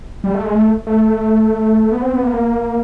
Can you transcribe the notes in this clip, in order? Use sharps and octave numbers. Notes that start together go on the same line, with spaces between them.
G3
A3
G#3
A3
A3
B3
C4
B3
A#3
B3
A#3